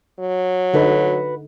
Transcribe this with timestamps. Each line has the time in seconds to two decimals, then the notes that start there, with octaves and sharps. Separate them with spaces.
0.19 F#3
0.74 D3 D#4 F#4 A4 B4